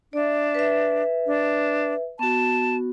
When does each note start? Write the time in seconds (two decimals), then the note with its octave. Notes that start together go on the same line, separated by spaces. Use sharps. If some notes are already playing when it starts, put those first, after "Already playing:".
0.13 D4 D5 E5
0.55 B4 E5
1.27 D4
2.19 B3 F#4 A5